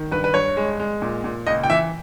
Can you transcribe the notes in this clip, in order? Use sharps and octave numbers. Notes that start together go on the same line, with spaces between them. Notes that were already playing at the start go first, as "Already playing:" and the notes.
Already playing: D#3
G2 B4
B4
G2 C#5
G#3
G#3
A#2
A#2
C#2 D#5
G5
E3 E5